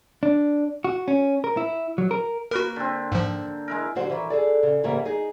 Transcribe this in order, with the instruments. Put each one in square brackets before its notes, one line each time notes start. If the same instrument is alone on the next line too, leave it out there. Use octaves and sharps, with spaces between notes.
[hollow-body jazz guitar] D4
F#4
C#4
A#4
E4
F#3
A#4
[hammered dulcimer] A#3 B4 [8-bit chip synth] F#4 A#4
[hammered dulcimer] D3 C4
[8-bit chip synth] G#2 F3
[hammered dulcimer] G#3 E4 A#4
[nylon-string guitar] D3 F#3 G3 F#4 C5
D#3 E3
G#4 A4 D5
C#3
G#2 C#3 E3 G3 A#3 E5
D#4 G#4 D#5